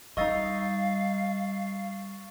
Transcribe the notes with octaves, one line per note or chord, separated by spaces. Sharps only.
G3 D#4 D#5 F5 C#6 E6 A6